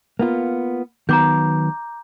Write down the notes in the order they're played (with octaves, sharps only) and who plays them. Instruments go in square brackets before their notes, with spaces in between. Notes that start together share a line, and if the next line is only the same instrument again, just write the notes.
[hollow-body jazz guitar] A#3 B3 F4
[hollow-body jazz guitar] D#3 F#3 B3 [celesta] A#5 D6 G6